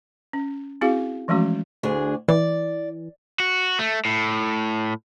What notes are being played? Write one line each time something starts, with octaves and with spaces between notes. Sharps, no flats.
C#4
C4 E4 F#4 G#4 F5
E3 F3 G#3 A3 C#4 F#4
D2 D4 G#4
E3 D5
F#4
A3
A2